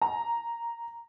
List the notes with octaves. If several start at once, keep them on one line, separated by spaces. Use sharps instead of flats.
A#5